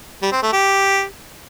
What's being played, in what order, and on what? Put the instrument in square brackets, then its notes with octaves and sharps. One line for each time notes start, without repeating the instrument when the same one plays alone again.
[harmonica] G3
C4
A3
G4